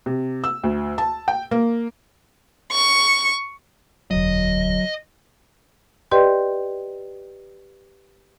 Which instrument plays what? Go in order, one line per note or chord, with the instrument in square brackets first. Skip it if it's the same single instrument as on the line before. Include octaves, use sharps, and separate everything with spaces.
[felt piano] C3
E6
D2
A5
G5
A#3
[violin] C#6
[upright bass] E1 D2 [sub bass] F#3 [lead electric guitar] D#5
[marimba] G4 B4 D5 D#5 G5 C6